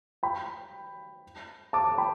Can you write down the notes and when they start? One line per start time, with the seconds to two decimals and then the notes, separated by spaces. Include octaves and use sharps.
0.23 G5 B5
1.73 A5 D6
1.98 G5 B5